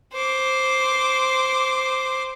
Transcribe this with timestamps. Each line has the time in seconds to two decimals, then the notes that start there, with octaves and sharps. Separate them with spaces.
0.13 C5 D6